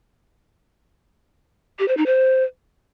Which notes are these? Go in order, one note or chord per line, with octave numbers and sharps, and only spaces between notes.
G4
C5
D#4
C5